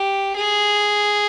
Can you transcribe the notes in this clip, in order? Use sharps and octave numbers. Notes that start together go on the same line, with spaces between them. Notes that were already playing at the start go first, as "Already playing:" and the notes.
Already playing: G4
G#4